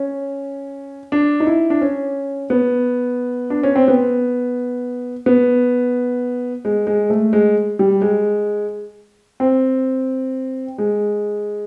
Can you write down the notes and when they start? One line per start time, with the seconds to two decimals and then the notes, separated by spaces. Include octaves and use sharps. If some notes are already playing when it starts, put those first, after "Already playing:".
Already playing: C#4
1.12 D4
1.40 D#4
1.47 E4
1.70 D4
1.81 C#4
2.50 B3
3.50 D4
3.63 C#4
3.76 C4
3.88 B3
5.26 B3
6.65 G#3
6.87 G#3
7.10 A3
7.33 G#3
7.79 G3
8.02 G#3
9.40 C4
10.78 G#3